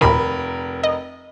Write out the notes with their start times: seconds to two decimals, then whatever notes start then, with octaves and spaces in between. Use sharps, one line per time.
0.01 F1 D#2 A#2 D#3 A#4 B5
0.83 D#5